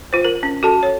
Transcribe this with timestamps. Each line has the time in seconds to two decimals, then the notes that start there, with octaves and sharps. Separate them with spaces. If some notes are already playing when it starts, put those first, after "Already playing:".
0.13 F4 C5
0.25 A#4
0.43 C#4
0.63 F#4 A4 A5
0.83 C#5